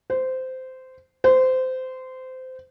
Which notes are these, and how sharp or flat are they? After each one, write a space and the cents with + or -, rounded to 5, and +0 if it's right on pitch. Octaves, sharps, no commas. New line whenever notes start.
C5 -15
C5 -20